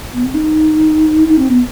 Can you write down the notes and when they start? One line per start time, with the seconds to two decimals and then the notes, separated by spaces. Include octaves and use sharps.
0.13 B3
0.24 C4
0.34 D#4
1.28 D#4
1.38 C4
1.49 B3